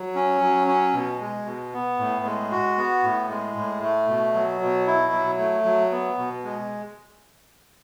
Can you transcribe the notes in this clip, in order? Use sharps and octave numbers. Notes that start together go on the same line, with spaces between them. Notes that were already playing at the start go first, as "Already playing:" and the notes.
Already playing: F#3
C#4
F#3
C#4
B2
G#3
B2
B3
A2
G#3
F#4
B3
A2
G#3
A2
A3
B2
F#3
B2
E4
F#3
A3
F#3
B3
B2
G#3